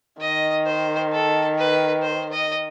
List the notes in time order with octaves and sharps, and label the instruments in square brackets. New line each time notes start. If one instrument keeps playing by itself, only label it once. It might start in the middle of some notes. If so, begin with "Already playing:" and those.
[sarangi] D#3 [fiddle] D#5
[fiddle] C5
A4
B4
C5
D#5